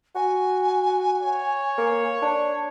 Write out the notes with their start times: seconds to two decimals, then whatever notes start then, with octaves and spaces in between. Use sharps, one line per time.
0.15 F#4 G#5
1.22 C#5
1.78 A#3
2.22 D4